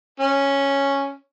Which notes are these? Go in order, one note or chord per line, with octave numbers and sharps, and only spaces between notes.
C#4